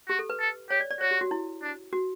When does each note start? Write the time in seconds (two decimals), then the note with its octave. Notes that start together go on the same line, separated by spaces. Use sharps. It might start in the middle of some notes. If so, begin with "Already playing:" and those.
0.08 F#4 G4
0.19 A4
0.30 B4
0.40 A4
0.70 G4 C#5
0.80 D5
0.91 D5
1.00 F#4 C#5
1.11 G4
1.21 F#4
1.31 E4
1.62 D4
1.93 F#4